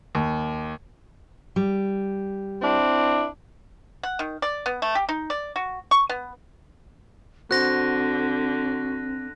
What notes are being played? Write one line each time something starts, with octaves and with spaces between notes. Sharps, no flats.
D#2
G3
C4 D4 E4
F#5
D#3
D5
B3
A3
G4
D#4
D5
F#4
C#6
B3
D3 C4 F#4 C5 F#6 A#6